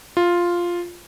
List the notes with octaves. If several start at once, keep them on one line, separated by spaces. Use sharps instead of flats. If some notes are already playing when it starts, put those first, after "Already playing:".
F4